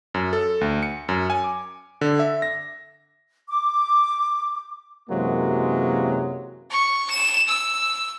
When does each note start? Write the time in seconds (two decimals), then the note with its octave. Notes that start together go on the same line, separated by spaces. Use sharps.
0.14 F#2
0.33 A4
0.61 D2
0.83 C#7
1.09 F#2
1.30 G#5
1.44 D6
2.01 D3
2.19 E5
2.42 A#6
3.48 D6
5.09 F#2 C3 E3 F#3 G#3 A#3
6.71 C#6
7.11 E7
7.49 E6